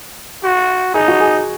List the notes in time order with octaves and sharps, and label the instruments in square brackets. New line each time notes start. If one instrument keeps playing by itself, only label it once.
[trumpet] F#4
[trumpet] D#4 [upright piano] G#4
[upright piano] F#4
G#4